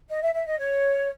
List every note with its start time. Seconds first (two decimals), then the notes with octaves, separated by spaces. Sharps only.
0.09 D#5
0.22 E5
0.34 E5
0.46 D#5
0.58 C#5